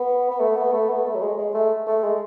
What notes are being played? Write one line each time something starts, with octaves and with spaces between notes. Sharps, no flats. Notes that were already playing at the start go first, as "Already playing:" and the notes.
Already playing: B3
B3
A3
B3
A3
B3
A3
F#3
G#3
G#3
A3
A3
G#3